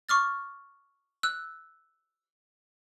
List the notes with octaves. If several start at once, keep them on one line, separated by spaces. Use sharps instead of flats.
C#6 D6 F6 A6
E6 F#6